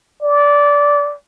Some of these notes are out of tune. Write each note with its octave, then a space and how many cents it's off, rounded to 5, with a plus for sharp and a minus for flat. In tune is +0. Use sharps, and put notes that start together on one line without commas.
D5 -15